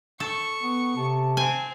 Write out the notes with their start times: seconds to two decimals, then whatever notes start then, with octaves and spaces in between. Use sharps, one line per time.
0.20 A4 C#6
0.62 B3
0.96 C3 A5
1.37 C4 G#5